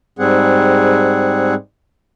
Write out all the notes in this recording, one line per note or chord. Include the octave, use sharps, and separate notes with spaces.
G#2 G3 C4 G#4 F#5